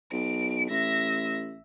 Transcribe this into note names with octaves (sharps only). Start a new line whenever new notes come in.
B1 D7
A1 E5 A#6